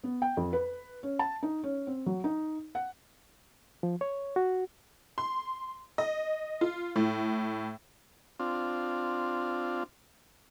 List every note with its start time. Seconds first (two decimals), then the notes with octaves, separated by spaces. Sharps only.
0.04 B3
0.22 G5
0.37 F2
0.53 B4
1.03 C#4
1.19 A5
1.43 D#4
1.64 C#4
1.87 C4
2.06 F#3
2.24 D#4
2.75 F#5
3.83 F3
4.01 C#5
4.36 F#4
5.18 C6
5.98 D#5
6.61 F4
6.96 A2
8.40 C4 D4 F4